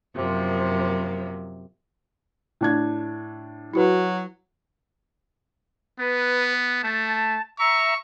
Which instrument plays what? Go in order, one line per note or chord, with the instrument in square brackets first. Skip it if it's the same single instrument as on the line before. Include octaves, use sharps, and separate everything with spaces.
[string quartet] F#2 C3 F3 A#3
[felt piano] A2 D4 G#6
[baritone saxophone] F#3 [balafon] E4 F#4 B4
[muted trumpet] B3 [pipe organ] B4
[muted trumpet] A3 [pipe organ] A5
[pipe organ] E5 A#5 E6 [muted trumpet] C#6